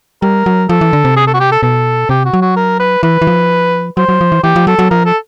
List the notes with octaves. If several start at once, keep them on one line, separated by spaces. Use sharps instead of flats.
G3 A#4
F#3
F3 A4
E3
D3
C3
G#4
A4
F#4
G4
A4
B2 A4
C3 G4
F#4
F#3
F#4
A#4
B4
E3 B4
E3
F3
F#3 C5
F#3
F3
E3
E3 G4
F3
F#3 A4
F#3
F3 A#4
A4